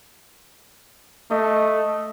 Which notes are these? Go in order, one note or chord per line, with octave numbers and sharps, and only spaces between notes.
A3 D#5